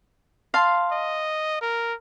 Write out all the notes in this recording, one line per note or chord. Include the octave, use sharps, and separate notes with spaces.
F5 A5 C6
D#5
A#4